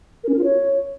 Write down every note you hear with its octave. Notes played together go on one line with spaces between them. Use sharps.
A#4
C#4
A#4
F4
C#5